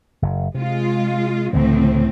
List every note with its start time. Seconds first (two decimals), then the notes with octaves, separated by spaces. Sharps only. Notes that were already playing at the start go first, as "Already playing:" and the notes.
0.22 F#1
0.54 C3 G#3 F4
1.53 C#2 A2 D3 E3 C4